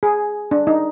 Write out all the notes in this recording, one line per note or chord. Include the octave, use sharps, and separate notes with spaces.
G#4
D4
D#4